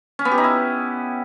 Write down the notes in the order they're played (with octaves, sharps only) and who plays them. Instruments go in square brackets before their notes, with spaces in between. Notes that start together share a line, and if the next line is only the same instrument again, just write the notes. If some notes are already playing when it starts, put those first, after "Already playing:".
[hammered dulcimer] C#4
B3
G4
D#4
E4